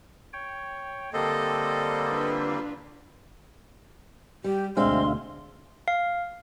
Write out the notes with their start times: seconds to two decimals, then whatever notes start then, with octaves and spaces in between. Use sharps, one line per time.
0.33 C#5 G5
1.13 D3 G3 A#3 C4 A4 C5 D#5
2.09 D4 F4 B4
4.44 G3 G4
4.77 D2 B2 G#3 C4 D4 E5 F5 C6
5.88 F5